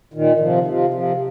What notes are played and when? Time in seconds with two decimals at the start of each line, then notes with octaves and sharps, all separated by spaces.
0.14 A#2 D#3
0.40 C3 F3
0.66 C3 F3
0.93 C3 F3